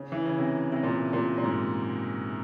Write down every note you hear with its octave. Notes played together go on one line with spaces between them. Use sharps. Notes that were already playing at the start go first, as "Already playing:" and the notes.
Already playing: C#3
E3
C#3
C3
C3
A#2
A#2
A#2
G#2